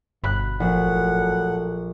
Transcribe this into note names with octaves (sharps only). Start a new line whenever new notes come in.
G1 B2 B5 F#6
A#1 A2 F#3 A4 F#5